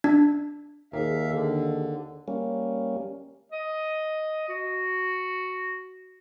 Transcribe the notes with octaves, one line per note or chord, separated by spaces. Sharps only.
D4
D#2 G#4 A#4 E5 F5
D3 G#4
G3 A#3 C#4
D#5
F#4